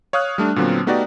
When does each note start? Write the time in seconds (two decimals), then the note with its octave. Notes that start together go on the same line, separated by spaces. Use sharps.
0.13 C#5 F5 D#6 F6 F#6
0.38 G3 A3 D4
0.56 A#2 D3 F#3 B3 C4
0.87 A3 B3 D#4 F#4 G4 D5